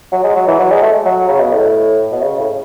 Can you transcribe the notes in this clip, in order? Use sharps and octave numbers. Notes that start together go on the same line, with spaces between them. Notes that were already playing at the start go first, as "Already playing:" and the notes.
F#3
G#3
F#3
E3
F#3
G#3
A3
F#3
C#3
B2
A2
B2
C#3
A2